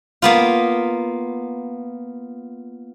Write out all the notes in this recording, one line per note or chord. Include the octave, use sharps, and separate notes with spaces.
A#3 B3 F4